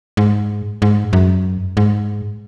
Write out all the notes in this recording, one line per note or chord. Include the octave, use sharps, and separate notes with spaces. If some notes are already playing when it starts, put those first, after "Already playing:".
G#2
G#2
F#2
G#2